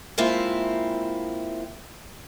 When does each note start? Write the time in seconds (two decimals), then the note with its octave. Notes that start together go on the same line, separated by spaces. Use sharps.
0.18 G#3 A#3 C4 E4 F4 E5